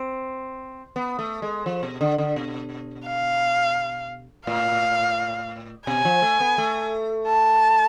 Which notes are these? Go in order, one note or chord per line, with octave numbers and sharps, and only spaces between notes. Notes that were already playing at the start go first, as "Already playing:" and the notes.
Already playing: C4
B3
A3
G#3
F3
B2
D3
D3
B2
F5
A2 F5
B2 G#5
F3
A3
B3
A3
A5